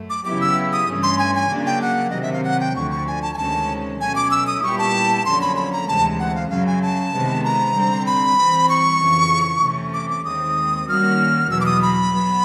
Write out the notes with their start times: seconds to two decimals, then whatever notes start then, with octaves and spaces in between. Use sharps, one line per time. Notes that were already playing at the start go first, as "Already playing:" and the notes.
Already playing: F#2 A3
0.10 D6
0.25 C#3 F#3 B3 E4 G4 D6
0.41 E6
0.73 D#6
0.88 G2 E3 A3 C#4
1.03 C6
1.19 G#5
1.35 G#5
1.50 C#3 F#3 A#3 D4
1.66 G5
1.82 F#5
2.10 C3 D#3 F#3 D#5
2.22 E5
2.33 F5
2.44 F#5
2.60 G5
2.76 D2 D3 F3 C#6
2.91 C#6
3.07 G#5
3.22 A5
3.34 G#5
3.37 D2 C3 D#3 G#3 C#4 A5
4.00 B2 F#3 A3 C#4 G#5
4.15 D6
4.31 E6
4.47 D#6
4.62 A#2 G3 B3 E4 G4 C#6
4.78 A5
5.25 F2 D3 F#3 A#3 C#4 C6
5.41 B5
5.56 B5
5.72 A#5
5.87 D2 C3 E3 G#3 A5
6.19 F#5
6.35 F5
6.50 F#2 C#3 F#3 F5
6.67 G#5
6.82 A5
7.13 C3 D#3 G#3 B3
7.44 A#5
7.75 D3 G3 C4
8.06 B5
8.38 E3 G3 C4
8.69 C#6
9.01 F2 C#3 E3
9.63 C3 E3 A3 C#4
9.94 D6
10.10 D6
10.25 D#2 D#3 G#3 C4 D#6
10.88 D#3 G3 A#3 C#4 F#4 F6
11.50 E2 B2 F#3 E6
11.61 D6
11.66 D#6
11.82 B5
12.13 F#3 B3